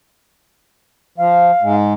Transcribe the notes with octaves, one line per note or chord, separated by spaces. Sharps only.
F3 F5
G#2 G#3